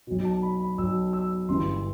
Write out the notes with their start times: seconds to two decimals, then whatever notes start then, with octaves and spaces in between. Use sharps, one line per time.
0.07 B1 B2
0.25 A5
0.42 B5
0.60 B5
0.78 B1 B2 E6
1.13 E6
1.49 G1 G2 E3 C6